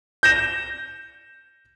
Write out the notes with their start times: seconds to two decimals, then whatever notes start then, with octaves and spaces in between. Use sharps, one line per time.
0.23 G6 A#6 E7